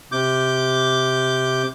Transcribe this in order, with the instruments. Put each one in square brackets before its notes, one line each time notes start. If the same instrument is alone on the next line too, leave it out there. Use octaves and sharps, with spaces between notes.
[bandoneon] C3 D6 G6